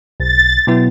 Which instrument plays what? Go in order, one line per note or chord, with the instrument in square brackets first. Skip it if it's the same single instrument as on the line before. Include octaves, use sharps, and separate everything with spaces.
[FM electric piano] B1 [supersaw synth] A6
[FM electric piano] B2 F#3 B3 E4